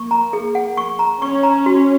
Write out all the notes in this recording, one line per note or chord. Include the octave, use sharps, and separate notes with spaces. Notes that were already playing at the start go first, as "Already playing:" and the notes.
Already playing: A#3 C#6
A#5
G#4
F#5
C#6
A#5
C#4 C#6
A#5
F#4